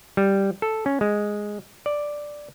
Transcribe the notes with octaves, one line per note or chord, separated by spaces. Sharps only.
G3
A4
C#4
G#3
D5